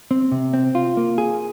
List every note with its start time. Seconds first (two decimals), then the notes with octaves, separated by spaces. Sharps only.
0.11 C4
0.32 C3
0.53 C4
0.75 F4
0.97 A#3
1.18 G#4